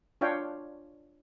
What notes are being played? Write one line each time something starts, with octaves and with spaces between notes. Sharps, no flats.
D4 F4 C#5 F5 G5